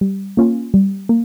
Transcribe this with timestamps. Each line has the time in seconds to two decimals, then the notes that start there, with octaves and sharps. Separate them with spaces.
0.01 G3
0.37 A#3 C#4 F4
0.74 G3
1.09 A#3